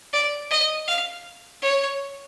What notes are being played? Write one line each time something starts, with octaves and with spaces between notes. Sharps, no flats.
D5
D#5
F5
C#5